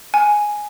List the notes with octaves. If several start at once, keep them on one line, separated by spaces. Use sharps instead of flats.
G#5